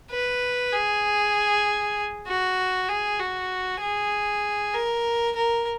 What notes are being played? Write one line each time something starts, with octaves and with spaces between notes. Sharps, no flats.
B4
G#4
F#4
G#4
F#4
G#4
A#4
A#4